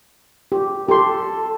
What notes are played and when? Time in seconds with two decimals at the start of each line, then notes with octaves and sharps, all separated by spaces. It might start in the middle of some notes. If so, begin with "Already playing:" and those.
0.52 G4
0.88 G4 A4 C6